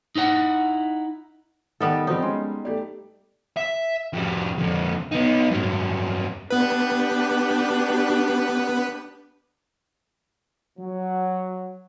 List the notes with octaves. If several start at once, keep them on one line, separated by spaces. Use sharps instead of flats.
D#4 E4 B4 F#5
D#3 G3 B3 A4
F3 G3 C4 D#4
G#3 C#4 C6
A3 G4 D5
E5
F2 G3
F2 D3
B3 D#4
G2 F#3
B3 D4 G4 B4
F#3